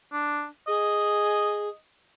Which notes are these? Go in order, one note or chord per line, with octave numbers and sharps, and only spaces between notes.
D4
G#4 D#5